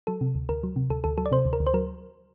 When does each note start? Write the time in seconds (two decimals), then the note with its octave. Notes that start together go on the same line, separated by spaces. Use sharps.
0.07 F#3 A4
0.21 C3
0.35 D2
0.49 D2 A#4
0.63 F#3
0.76 C3
0.90 D2 A4
1.04 D2 A4
1.18 F#3 A4
1.26 D5
1.31 C3 C5
1.45 D2
1.53 A#4
1.60 D2
1.67 C5
1.74 F#3 A#4